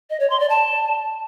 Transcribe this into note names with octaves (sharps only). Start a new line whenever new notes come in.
D#5
C#5
C6
D5
A5